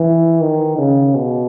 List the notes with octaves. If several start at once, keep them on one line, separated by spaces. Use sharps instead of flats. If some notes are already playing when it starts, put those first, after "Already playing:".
Already playing: E3
D#3
C#3
B2